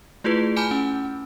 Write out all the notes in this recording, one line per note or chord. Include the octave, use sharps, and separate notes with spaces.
A3 E4 F4 G#4 B4
G#5 A5 B5 D6 F6 G6
C#4